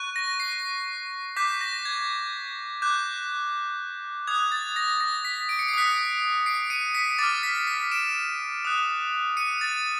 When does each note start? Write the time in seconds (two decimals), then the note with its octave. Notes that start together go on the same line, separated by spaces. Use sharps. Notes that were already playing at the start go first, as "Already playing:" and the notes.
Already playing: C#6 F#6
0.16 A#6
0.40 C7
1.37 D6 G6 B6
1.61 A#6
1.85 G#6
2.82 D6 F#6 G6
4.27 D#6 F#6 G#6
4.52 A6
4.76 A#6
5.00 A#6
5.25 B6
5.49 D7
5.59 C#7
5.68 C7
5.73 D#6 F#6 B6 C#7
6.46 C7 D7
6.70 C#7 D#7
6.95 B6 C#7
7.18 D6 F6 A6
7.43 B6
7.67 B6
7.91 D7 E7
8.65 D#6 F#6
9.37 C#7 D#7
9.61 A6